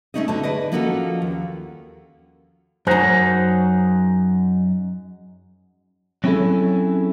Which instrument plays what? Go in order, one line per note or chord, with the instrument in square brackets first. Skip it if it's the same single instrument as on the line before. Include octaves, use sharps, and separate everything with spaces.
[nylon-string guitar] A3 B3 C#4 D#4 D5 D#5
D2 D3 F#4 A5
G#4 B4 D5 D#5
F3 A#3 C#4 F#4 G#4 A4
D#2
[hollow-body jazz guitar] F#2 A#5 [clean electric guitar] D#4 F#4 G#4 [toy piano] C5
[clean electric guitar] F#3 C4 C#4 E4 G#4 A4